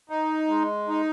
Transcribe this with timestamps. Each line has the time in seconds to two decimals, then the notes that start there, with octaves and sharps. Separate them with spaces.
0.10 D#4
0.48 G#3
0.88 D#4